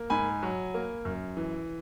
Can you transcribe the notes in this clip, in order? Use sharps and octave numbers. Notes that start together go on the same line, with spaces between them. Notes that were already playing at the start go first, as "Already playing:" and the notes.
Already playing: A#3
G#2 G#5 B5
F#3
A#3
F#2
E3